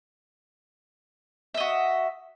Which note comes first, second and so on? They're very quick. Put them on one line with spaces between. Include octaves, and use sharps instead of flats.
E5 D#5 F#4